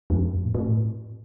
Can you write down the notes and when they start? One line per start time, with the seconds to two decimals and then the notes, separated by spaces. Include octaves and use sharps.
0.10 F2
0.33 A2
0.44 A#2
0.54 A2